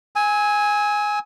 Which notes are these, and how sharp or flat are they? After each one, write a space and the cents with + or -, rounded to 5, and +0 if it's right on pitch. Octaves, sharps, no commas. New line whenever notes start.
G#5 +0 E6 -40